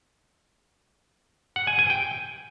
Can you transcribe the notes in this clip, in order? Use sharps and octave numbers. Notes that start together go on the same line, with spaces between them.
F#5
G#5
G#5
G5